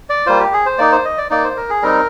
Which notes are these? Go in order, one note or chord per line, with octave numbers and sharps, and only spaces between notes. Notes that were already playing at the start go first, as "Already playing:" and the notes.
D5
G3 A#3 F4 C5
G4
G#4
C5
A#3 D#4 D5
C5
D#5
D5
A#3 D#4 D5
C5
A#4
G#4
G3 C4 D#4 A#4